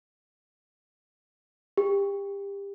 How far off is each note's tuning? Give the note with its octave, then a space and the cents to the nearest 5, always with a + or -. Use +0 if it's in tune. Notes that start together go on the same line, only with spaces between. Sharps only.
G4 +30